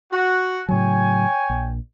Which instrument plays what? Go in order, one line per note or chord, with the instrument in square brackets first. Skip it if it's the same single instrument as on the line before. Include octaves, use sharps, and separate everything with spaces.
[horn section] F#4
[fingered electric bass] A2 C#3 F#3 [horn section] C#5 G5 G#5
[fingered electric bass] A#1